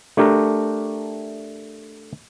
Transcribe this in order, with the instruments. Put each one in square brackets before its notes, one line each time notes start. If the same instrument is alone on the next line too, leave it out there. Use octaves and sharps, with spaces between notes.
[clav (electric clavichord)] A3 D4 G4 A#4